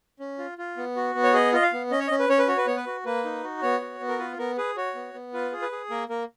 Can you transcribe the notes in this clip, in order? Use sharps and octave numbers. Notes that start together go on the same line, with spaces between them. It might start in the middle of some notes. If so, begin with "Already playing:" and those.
C#4
F4
F4
B3
F#4
B3
C#5
G#4 D#5
F4 D#5
F5
B3
C#4 D#5
C#5
D#5
C#4
B4
C#4 C#5
B4
F#4 C#5
B4
B3 C#5
B4
F#4
A#3 B4
D#4
F#4
B3 C#5
F#4
B3
A#4
F4 B4
B3 A#4
G#4 B4
F#4 C#5
B3
B3
F4 B4
G#4
B4
G#4
A#3 A#4
A#3 A#4